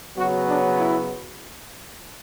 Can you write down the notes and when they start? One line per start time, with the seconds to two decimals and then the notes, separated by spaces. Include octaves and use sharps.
0.17 C#3 F#3 B3 F#4
0.47 D4
0.77 E4